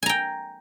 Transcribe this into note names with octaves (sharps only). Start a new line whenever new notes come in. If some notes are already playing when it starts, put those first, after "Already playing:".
G5 G#5 A#5